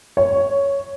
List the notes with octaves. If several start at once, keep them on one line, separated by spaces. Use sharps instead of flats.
C#5